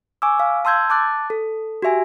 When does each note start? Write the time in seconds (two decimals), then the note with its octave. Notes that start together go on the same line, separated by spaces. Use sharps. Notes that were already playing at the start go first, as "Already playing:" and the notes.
0.22 G#5 C#6 D6 E6
0.40 F5
0.65 A5 C6 E6 G6 G#6
0.90 A5 D6 F#6 A6
1.30 A4
1.82 F#4 G4 E5 G#5